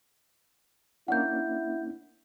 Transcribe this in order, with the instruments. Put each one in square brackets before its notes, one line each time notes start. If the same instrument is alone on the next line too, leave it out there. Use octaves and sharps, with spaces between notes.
[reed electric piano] A#3 C#4 D4 [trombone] E4 [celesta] F#5 G6